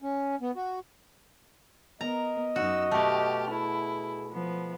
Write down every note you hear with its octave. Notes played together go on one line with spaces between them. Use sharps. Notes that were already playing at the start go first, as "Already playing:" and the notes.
C#4
B3
F#4
B3 A#4 D#5 A#5
F#2 D#4 F#4 E6
B2 A3 G4 F6
E4 G#4
F3 B3